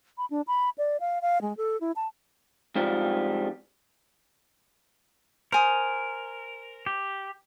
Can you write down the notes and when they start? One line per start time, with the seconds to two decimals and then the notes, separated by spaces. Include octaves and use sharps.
0.18 B5
0.30 D4
0.47 B5
0.78 D5
1.00 F5
1.22 F5
1.42 G#3
1.57 A4
1.81 E4
1.96 A5
2.76 F2 G#2 F3 G3
5.52 A#4 C5 G#5 D#6
6.86 G4